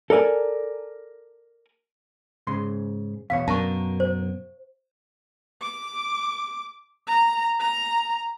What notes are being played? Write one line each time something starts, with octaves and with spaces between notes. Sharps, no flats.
A4 A#4 D5 G#5
G#2 C#3 C6
E2 B2 C#5 F5
F#2 B2 D4 A#4 A5 C#6
C5
D6
A#5
A#5